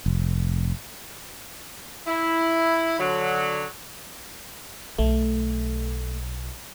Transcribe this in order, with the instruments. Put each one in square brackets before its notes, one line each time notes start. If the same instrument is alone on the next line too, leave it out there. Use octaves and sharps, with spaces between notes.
[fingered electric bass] F1
[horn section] E4
D3 F#3
[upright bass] B1 [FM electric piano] A3